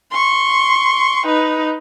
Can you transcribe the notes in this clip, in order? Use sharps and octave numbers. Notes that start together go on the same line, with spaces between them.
C6 C#6
D#4 B4